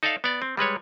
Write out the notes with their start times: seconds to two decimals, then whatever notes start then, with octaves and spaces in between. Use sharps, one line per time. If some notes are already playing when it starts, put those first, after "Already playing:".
0.03 D#4 A4 D5 E5 F5
0.24 B3 D5
0.42 C4
0.57 G3 G#3 B4 C#5